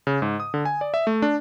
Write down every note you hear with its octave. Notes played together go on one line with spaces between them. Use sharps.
C#3
G#2
D#6
D3
G#5
D5
E5
A3
D4